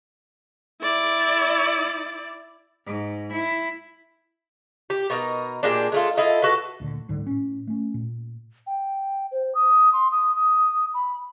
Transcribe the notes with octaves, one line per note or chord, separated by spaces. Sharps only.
E4 D5
G#2
E4
G4
B2 D#4 A#4
A#2 G3 G#3 D4
G#3 A3 F4
E4 F4 A4 D#5
F#4 A4 B4
D2 A#2 D3
C#2 G#2 D3 G3
A2 C#4
A3 C#4
A#2
G5
C5
D#6
C6
D#6
D#6
B5